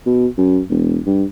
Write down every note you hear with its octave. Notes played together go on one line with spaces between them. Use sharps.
B2
F#2
E1
G2